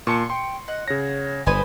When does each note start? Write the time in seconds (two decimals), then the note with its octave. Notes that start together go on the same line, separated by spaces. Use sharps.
0.07 A#2 A5 C6 C#6 C#7
0.30 G5 C6
0.68 D#5 F#5
0.88 C#3 C#5 A#6
1.47 G1 B4 C5 G#5 D#6